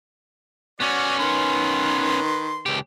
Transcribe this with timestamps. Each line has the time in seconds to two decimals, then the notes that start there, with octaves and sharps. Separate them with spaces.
0.80 B3 C#4 F#4 D5
1.19 D#3 B4 C6
2.66 C#2 G4